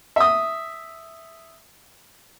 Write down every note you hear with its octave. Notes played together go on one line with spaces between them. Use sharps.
E5 D#6